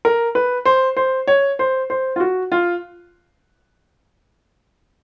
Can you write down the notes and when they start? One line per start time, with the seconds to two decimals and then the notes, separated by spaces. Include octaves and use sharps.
0.05 A#4
0.35 B4
0.65 C5
0.97 C5
1.27 C#5
1.59 C5
1.90 C5
2.16 F4
2.20 F#4
2.52 F4